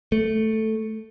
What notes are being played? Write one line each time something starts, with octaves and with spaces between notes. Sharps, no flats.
A3